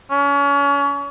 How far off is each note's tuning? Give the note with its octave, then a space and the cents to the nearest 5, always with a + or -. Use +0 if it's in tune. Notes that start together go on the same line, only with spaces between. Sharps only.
C#4 +35